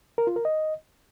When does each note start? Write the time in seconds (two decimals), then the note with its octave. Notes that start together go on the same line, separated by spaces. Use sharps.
0.18 A#4
0.27 F4
0.36 A#4
0.45 D#5